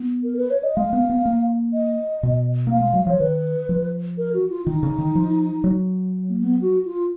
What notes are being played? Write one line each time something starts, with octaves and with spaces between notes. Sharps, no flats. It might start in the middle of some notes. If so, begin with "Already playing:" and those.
Already playing: B3
A#4
B4
C#5
D#5
G#3 F5
B3
B3
A#3
D#5
B2
A#3 F5
G#3
F#3
F3 C#5
D#3 B4
F3
A#4
F#4
F4
D#3 D#4
C#3
D#3
F3
F#3
A#3
A#3
B3
F#4
F4